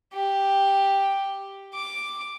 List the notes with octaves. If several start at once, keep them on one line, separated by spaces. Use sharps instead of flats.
G4
D6